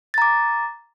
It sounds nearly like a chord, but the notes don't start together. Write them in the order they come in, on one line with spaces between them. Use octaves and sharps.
A6 A#5 D6